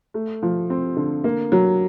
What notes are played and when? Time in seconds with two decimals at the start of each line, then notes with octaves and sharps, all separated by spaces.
0.14 A3
0.42 F3
0.70 C4
0.97 D3
1.24 A#3
1.52 F#3